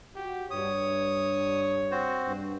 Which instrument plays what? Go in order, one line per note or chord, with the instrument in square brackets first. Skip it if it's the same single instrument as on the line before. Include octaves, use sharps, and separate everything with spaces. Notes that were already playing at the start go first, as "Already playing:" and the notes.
[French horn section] F#4 [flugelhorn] G4
[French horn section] G2 [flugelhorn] C#5 [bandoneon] D#6
[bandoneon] C4 F#4 C5
[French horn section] G2